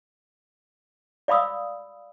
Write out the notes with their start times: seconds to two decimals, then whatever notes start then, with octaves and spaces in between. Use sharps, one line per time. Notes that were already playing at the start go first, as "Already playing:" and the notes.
1.28 D5 F5 B5 D#6 E6